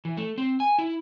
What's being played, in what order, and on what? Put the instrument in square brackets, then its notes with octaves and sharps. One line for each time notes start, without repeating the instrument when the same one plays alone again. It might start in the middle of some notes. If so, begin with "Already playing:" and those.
[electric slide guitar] E3
A3
C4
G#5
E4